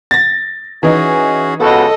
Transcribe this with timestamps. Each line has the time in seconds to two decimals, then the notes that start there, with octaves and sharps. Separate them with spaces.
0.11 A6 A#6
0.83 E3 C#4 D#4 F#4 G#4
1.60 C#2 B3 F#4 A4 D#5